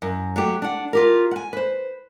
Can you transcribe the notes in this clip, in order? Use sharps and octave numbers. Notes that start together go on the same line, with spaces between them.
F#2
F#3 A3 G4
D4 F#5
F4 G4 A#4
F#5 G#5
B4 C5